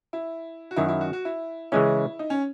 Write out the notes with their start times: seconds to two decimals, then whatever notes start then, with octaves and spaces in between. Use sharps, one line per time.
0.13 E4
0.71 F#4
0.76 F#2 D#3 F#3 E4
0.88 E4
1.01 F#4
1.13 F#4
1.25 E4
1.72 C#3 E3 G#3 C#4 E4
2.19 D#4
2.30 C#4